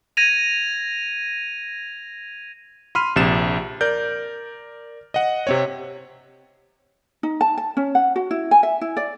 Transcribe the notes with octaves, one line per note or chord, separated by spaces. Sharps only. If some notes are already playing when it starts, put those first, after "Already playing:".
G#6 A#6 D#7 F7
B5 C6 F6 D#7
A#1 C3 A6 E7
A#4 D5 G6
D#5 F#5
C3 C4 C#5
D#4
A5
A5
C#4
F#5
F#4
E4
G#5
E5
E4
D5